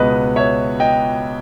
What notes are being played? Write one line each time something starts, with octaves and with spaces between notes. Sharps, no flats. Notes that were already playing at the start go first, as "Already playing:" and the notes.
Already playing: C#2 B2 G#3 B3 B4 D#5
C#5 E5
D#5 G5